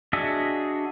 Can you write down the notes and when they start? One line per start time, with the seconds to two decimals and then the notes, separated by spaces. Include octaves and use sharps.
0.13 D4 F#4 G#4 D#5 E5